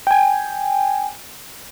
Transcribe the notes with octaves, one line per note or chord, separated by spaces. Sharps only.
G5 G#5